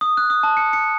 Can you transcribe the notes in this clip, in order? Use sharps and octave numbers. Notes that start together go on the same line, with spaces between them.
D#6
F#6
D#6
A5
C#7
C#7